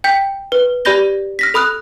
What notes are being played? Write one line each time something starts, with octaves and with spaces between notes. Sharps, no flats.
G5 G6 B6
B4
G4 D5 B5 G6 A#6 G7
F6 A#6 B6
A4 B5 D#6 F6 F#6